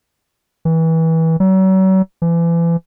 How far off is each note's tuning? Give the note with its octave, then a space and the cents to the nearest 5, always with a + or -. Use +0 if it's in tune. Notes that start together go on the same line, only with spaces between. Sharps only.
E3 -25
F#3 +40
E3 +35